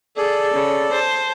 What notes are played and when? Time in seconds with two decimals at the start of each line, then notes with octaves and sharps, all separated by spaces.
0.17 G#4 A4 D5
0.53 C#3
0.91 C5 A5